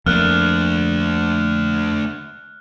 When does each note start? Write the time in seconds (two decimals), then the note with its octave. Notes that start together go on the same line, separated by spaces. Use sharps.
0.06 F2 A3 A#3 D4 F6 F#6